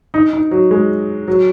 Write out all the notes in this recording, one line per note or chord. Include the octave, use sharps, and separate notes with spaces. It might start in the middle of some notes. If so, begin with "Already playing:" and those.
D#4
D#4
F#3
G#3
F#3